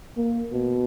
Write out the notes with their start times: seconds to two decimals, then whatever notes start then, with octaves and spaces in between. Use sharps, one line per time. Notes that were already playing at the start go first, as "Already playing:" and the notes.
0.17 A#3
0.52 B2